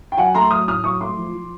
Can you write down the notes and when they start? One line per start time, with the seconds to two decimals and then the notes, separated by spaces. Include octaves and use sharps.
0.12 G5
0.17 F#3 F#5 G#5
0.35 A3 A#5 C6
0.51 F#3 D#6 F6
0.68 A2 D#6 F6
0.84 F#3 C#6 D#6
1.01 A3 C6 D6
1.17 F3
1.34 F3